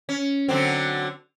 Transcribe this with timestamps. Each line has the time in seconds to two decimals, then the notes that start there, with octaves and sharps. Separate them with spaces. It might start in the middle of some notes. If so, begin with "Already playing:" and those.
0.09 C#4
0.48 D3 F#3 C4